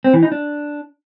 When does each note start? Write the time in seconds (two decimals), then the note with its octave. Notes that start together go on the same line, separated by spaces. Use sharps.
0.04 C4
0.14 E3
0.23 D#4
0.32 D4